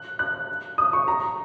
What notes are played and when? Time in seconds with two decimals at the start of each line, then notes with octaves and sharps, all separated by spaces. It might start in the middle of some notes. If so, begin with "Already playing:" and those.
Already playing: F#6
0.19 F#6
0.78 D#6
0.93 C#6
1.08 A#5